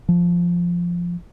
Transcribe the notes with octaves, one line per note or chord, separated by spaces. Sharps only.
F3